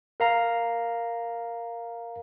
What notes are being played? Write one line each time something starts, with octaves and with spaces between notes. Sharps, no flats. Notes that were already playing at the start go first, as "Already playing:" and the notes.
A#4 F5 A#5